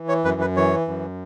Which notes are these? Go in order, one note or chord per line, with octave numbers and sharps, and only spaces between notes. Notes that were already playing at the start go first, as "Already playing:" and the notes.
Already playing: E3
C#5
F#2 B4
B4
E3 C#5
F#2